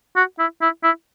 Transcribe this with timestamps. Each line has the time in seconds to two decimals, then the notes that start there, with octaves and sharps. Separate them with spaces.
0.16 F#4
0.39 E4
0.62 E4
0.84 E4